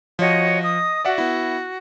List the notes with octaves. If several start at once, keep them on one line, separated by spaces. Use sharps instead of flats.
F3 F#4 C#5 D#5
D#5 D#6
F#4 D5 E5 F#5
B3 E4